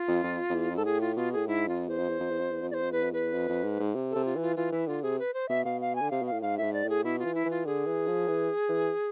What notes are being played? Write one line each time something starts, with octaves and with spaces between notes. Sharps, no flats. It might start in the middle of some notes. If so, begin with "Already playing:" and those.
Already playing: F4
F2
F2
F2
E2
F2
G#2 A4
A2 G#4
F4
B2 F4
A2 G#4
G#2 E4
F2 F4
E2 C5
F2
E2
F2
E2
F2
E2
F2
E2 C5 D5
F2
E2 B4
F2
E2 B4
F2
F2
G#2
G#2
C3
C3 A4
F4
E3
F4
E3 F4
E3 E4
D3 F4
C3 G#4
B4
C5
B2 E5
B2 F5
F5
G#5
D3
C3 F5
B2 F5
A2
G#2 F5
A2 E5
G#2
D5
A2
G#4
B2 E4
F4
E3
E4
E3 F4
D3 G#4
E3
F3
E3
E3